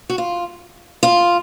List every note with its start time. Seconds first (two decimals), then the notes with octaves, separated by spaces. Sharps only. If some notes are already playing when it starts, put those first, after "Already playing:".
0.10 F#4
0.18 F4
1.03 F4